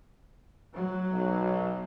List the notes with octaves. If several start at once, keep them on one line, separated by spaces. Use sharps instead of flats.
F#3
B1